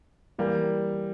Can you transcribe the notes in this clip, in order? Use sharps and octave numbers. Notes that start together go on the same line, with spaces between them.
E3 G3 A#3